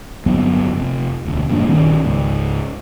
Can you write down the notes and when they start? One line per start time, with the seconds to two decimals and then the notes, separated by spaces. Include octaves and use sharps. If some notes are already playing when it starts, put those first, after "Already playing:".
0.26 G1 F2 F#3 B3
0.75 F1
1.25 E1 D2
1.50 E1 G2 A#3 D4
1.66 A#1 D#3 C4 C#4
2.03 C#2 G#2